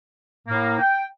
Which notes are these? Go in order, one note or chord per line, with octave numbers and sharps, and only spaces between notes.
A2 A#3
G5